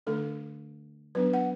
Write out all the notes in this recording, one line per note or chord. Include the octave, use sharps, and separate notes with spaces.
D3 A3 D4 A4
F#3 B3 D4 B4
F#5